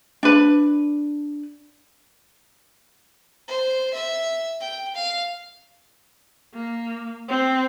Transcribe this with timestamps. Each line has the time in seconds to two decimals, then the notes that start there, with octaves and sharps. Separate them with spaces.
0.23 D4 B4
3.48 C5
3.94 E5
4.60 G5
4.95 F5
6.54 A#3
7.29 C4